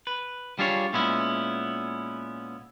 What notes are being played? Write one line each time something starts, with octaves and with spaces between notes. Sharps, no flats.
B4
G3 D4 F4 G#4 C5 C#5
A#2 G#3 B3 C#4 E4